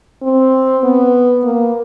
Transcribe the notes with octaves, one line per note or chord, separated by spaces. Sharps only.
C4
B3
A#3